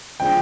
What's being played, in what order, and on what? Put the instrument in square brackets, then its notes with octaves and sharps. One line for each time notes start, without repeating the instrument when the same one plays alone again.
[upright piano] D3 F3 G#3 G5